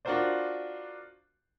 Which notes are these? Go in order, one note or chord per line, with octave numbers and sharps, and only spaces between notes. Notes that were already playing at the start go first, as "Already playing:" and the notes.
D4 F4 F#4 A#4 C5 D5